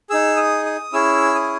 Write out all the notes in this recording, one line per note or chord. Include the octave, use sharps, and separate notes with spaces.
D#4 G#4 E6
D#6
D#6
C#4 E4 G#4 E6
D#6